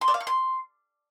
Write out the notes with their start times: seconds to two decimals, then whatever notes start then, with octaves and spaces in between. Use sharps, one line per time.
0.01 C6
0.08 D5
0.14 F5
0.21 C#6
0.27 C6